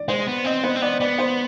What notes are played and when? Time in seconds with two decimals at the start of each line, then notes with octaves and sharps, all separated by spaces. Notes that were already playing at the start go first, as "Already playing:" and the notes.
Already playing: D5
0.08 G#3 C5
0.27 B3
0.45 C4 D#5
0.64 B3 C5
0.76 C4
0.82 B3 D5
1.00 B3 D5
1.19 C5